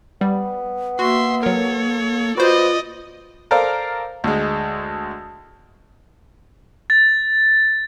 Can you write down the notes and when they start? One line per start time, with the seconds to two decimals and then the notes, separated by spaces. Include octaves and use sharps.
0.21 G3 B3
0.99 A#3 F#4 E5 C6
1.43 F#3 A4 A#4 C#5
2.37 F4 F#4 B4 C5 D5 D#5
3.51 A4 A#4 C5 D5 F5 A#5
4.24 D2 G#3
6.90 A6